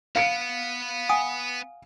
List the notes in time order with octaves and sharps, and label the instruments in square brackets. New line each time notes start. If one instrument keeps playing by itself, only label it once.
[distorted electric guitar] B3 [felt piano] F5 C#7 D7
[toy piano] F#5 G#5 D#6